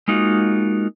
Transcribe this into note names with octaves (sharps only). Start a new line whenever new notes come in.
G#3 A#3 D#4 F4 F#4